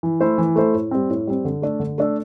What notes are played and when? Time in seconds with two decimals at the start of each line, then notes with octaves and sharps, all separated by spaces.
0.03 E3
0.20 A3 E4 A4 C5
0.38 E3
0.56 A3 E4 A4 C5
0.74 A2
0.91 G3 C4
1.10 A2
1.27 G3 C4
1.45 D3
1.62 A3 D4 A4
1.80 D3
1.98 A3 D4 A4